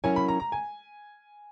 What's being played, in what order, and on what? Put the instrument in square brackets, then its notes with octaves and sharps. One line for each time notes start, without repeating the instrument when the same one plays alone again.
[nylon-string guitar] F#3 C#4 E4 A#4 C#5 [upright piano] G#5
[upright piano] B5
A#5
A#5
G#5